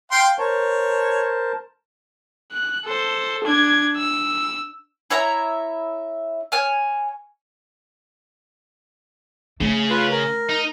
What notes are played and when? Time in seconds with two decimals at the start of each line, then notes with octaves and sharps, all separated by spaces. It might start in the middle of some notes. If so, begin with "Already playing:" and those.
0.11 F5 G5 C6
0.39 A#4 C5 C#5 A5
2.52 F#6
2.85 A4 C5
3.44 D4 G#6
3.96 E6
5.10 E4 C#5 E5 A#5
6.52 C#5 G#5 F6
9.60 C#3 A3
9.90 F4 B4
10.11 A#4
10.49 D#4